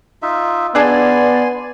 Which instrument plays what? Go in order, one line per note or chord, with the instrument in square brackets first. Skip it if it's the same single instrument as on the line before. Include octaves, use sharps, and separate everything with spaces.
[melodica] D#4 F4 E5
[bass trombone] B3 [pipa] D4 G#4 A5 [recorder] D5 [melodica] G#5 C6